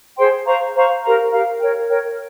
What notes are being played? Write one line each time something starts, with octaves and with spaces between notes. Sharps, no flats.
G#4 C5 G5 C6
C5 F5 A#5 C#6
C5 F5 A#5 C#6
G4 A#4 F5 A#5
G4 A#4 F5 A#5
A#4 C#5 G5
A#4 C#5 G5